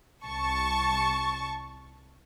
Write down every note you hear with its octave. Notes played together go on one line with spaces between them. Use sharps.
C2 A5 C#6